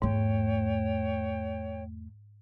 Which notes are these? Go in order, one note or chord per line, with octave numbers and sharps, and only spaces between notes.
E2 G#2 A3 C#5 G5